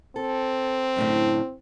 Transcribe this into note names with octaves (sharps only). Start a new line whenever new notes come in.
C4 A4
F#2 A2 D3